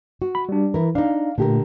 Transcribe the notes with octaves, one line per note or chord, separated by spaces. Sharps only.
F#4
B5
G3 D4
E3 E4 A#4
D4 D#4 F5
A#2 D3 A3 G4 A#4